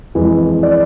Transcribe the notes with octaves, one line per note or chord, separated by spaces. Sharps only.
F2 E3 G#3
D5